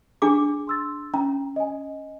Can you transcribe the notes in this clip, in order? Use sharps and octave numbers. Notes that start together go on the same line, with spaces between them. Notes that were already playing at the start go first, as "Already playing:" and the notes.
D4 G#4 D6
C6 E6 A6
C#4 A#5
D#5 G#5